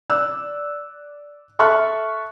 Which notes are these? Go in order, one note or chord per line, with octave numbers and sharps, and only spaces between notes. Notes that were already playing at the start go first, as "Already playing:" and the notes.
D5 E6 F#6
A4 E5 A5 C#6 F6 F#6